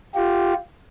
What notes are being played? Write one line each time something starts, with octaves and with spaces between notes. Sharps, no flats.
F4 G4